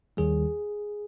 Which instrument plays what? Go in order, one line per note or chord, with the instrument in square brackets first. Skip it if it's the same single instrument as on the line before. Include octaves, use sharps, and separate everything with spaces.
[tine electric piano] D#2 D#3 G3 G#4